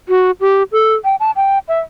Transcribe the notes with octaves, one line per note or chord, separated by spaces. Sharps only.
F#4
G4
A4
G5
A5
G5
E5